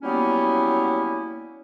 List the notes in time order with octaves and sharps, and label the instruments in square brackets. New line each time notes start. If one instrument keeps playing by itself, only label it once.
[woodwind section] F#3 G3 A#3 B3 C#4 E4